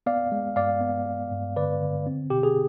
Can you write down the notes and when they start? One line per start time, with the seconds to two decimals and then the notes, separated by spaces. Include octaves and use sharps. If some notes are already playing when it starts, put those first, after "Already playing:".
0.06 B3 D5 F5
0.32 G#3
0.56 G2 D5 F5
0.81 B3
1.06 B3
1.31 G2
1.56 D3 B4 D5
1.81 D3
2.07 C4
2.30 B2 G4
2.43 G#4